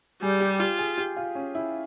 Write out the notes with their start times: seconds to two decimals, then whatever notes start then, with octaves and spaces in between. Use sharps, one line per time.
0.22 G3 G#4
0.40 G4
0.60 F4 G4
0.79 G#4
0.98 G4
1.17 F4
1.35 C#4
1.55 E4